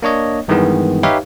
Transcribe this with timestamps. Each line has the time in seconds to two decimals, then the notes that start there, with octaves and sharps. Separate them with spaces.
0.03 A#3 D4 C#5 D#5
0.48 G2 D#3 E3 G#3 B3
1.03 D#4 G4 B4 C#5 E5 F5